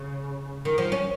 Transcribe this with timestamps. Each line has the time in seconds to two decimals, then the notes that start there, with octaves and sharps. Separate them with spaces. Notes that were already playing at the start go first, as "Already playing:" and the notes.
Already playing: C#3
0.65 D#3
0.78 F3
0.92 C#4